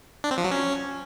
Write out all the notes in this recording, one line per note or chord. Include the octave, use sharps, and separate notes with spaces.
D4
C4
F3
F#3
C#4